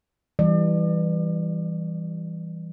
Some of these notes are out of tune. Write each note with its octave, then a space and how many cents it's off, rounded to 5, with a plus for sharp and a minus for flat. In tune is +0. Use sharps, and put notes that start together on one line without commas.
E3 +5 G3 +0 D5 +40